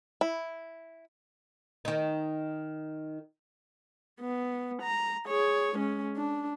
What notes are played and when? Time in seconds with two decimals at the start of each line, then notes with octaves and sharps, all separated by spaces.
0.21 E4
1.85 D#3 D#4
4.20 B3
4.82 A#5
5.28 G#4 C#5
5.76 G#3 C#4
6.17 D4